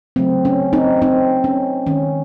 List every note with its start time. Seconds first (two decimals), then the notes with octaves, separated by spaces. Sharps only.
0.16 C#3 F#3 A3 C4
0.45 C#4
0.73 C4 D#4
1.02 C4 D#4
1.44 C#4
1.86 D#3 G#3 C#4